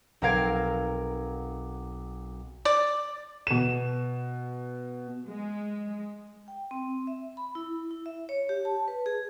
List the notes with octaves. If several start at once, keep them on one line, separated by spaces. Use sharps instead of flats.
B1 C4 A#4 F5 G#6 D7
D5
B2 E7
G#3
G5
C4
E5
B5
E4
E4
E5
C#5
G4
A5
B4
G#4